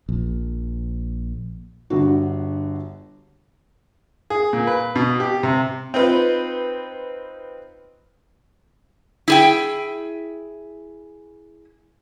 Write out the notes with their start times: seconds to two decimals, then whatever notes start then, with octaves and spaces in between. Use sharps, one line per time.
0.09 A#1
1.90 G1 D3 F#4
4.30 G#4
4.53 A#2
4.67 B4
4.96 B2
5.20 G4
5.43 C3
5.94 C4 D#4 F4 B4
9.28 E4 G#4 G5